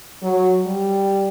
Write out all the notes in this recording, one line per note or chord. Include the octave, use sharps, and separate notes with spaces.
F#3
G3